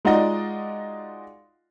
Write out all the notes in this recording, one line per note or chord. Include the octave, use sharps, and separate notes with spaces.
G#3 D#4 F4 F#4 D5 D#5